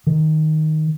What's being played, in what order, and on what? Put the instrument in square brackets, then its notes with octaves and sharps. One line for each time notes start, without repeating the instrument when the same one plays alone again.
[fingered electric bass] D#3